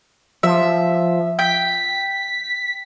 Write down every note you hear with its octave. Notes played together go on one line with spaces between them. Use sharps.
F3 E5
G5 G6 B6